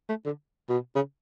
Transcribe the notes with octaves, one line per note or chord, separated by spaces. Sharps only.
A3
D3
B2
C#3